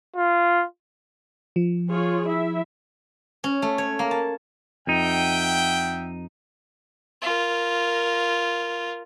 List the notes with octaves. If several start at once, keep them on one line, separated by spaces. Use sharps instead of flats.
F4
F3
F4 G#4 C#5
E4 E5
C#4
A3
C#5
A#3
A5
F2 D#4 E5 F#5 G5
F4 A#4